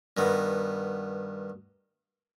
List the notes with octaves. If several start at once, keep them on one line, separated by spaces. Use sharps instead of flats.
G2 D#3 B3